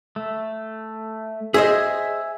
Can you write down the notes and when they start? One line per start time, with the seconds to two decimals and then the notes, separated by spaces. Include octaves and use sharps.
0.16 A3
1.54 G#4 C5 D#5 E5 G#5